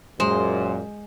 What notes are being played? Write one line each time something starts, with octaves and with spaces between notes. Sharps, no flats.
F#2 A#2 G#3 C5